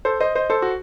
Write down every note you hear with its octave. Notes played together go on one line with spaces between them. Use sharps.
A4 C5
C5 D#5
C5 D#5
A4 C5
F#4